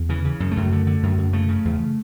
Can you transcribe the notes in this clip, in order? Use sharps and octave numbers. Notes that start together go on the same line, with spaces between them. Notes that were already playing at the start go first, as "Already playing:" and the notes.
Already playing: E2
C#3 E3
C#3
F#2
A3
F#2
D3
D3
F#2
F#2
C#3 A3
C#3
E2